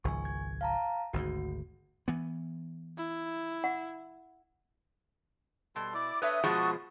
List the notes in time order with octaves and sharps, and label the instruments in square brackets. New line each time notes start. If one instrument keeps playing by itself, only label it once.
[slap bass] G#1 C#2 F3 [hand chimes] G#5 C#6
[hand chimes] G#6
F5 A5 A#5
[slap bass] G#1 D2 G#2 [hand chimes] F#4
[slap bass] E3 B3
[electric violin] E4
[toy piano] F#5
[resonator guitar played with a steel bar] B2 [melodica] G3 A4 C6
[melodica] E4 D5 [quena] D6
[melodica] D4 A4 [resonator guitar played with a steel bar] B4 C#5 E5 [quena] D#6
[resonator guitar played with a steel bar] B2 F3 G#3 [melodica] F#4 A5 C#6